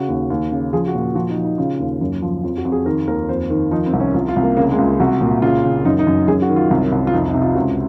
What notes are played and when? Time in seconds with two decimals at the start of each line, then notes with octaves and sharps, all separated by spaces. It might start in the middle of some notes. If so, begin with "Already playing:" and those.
Already playing: C#3 F#4
0.09 D#2
0.30 D#2
0.52 C#3
0.73 F3 G#4
0.88 F#4
0.95 A#2
1.01 F4
1.15 F3 F#4
1.30 D#4
1.37 F3
1.44 D#4
1.58 C#3 F4
1.80 D#2
2.01 F#2
2.22 F3
2.43 F2 F4
2.58 F#4
2.65 F2
2.72 G#4
2.86 D#3 A#4
3.07 D#2 A#4
3.29 F2 C5
3.50 D#3
3.71 F3 D#4
3.86 C4
3.93 C2
4.00 C#4
4.14 C2 F4
4.29 F4
4.36 C2
4.43 A#3
4.57 C#3 A#3
4.71 G#3
4.78 C#2
4.86 F4
5.00 C2 F#4
5.21 A#2
5.42 C#3 F4
5.64 C#3
5.85 F#2 D#4
5.99 D#4
6.07 F#2
6.28 F#2 G#4
6.42 F#4
6.49 D#3
6.56 F4
6.70 C2
6.92 C2
7.07 F4
7.13 F2 D#4
7.27 D#4
7.34 C3
7.42 F4
7.55 C#2 F#4